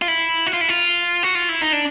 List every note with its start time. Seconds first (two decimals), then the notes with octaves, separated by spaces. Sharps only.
0.02 F4
0.08 E4
0.47 F#4
0.53 F4
0.61 E4
0.69 F4
1.23 F#4
1.35 F4
1.49 E4
1.62 D#4
1.73 D4